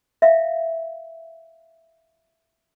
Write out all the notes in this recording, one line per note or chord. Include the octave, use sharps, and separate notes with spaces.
E5 F5